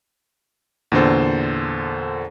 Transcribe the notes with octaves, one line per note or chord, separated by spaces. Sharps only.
E2 A#2 D3 A4 C5